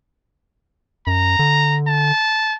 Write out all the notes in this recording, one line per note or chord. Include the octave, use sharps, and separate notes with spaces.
F#2 A#5
D3
A5